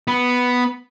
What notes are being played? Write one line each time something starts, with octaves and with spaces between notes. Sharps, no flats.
B3